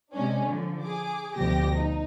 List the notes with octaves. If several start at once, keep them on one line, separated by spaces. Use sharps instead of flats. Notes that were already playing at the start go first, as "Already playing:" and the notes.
C3 G#3 C#4 D4
D3 F3
G#4 D6
D2 B2 F3 G4 A#6
D#4